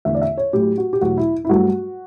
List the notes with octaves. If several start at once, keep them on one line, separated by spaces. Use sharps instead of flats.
E2 D3 A3 E5
D5
E5
C#5
A2 F#3 A3 G4
F#4
G4
E2 B2 F#3 A3 F#4
E4
E4
G2 F#3 A3 F#4